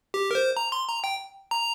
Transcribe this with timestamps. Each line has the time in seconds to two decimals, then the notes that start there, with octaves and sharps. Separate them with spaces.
0.14 G4
0.31 A#4
0.35 C5
0.57 A#5
0.72 C6
0.88 A#5
1.04 G5
1.51 A#5